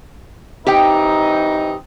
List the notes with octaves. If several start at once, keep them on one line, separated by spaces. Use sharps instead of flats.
E3 C4 D#4 G4 G5